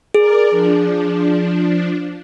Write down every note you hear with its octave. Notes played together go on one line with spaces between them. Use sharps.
G#4 A#4 D5
F3 D4